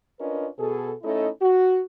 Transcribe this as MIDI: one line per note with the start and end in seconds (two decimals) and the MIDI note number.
0.20 0.48 61
0.20 0.48 62
0.20 0.48 65
0.20 0.48 70
0.20 0.48 71
0.20 0.48 75
0.58 0.92 47
0.58 0.92 68
0.58 0.92 69
1.03 1.28 57
1.03 1.28 61
1.03 1.28 63
1.03 1.28 64
1.03 1.28 69
1.03 1.28 75
1.41 1.81 66